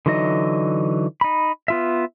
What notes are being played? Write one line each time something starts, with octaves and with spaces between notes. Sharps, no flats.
D3 E3 F#3 D#4 D#5
D#4 B5
B3 F4 E5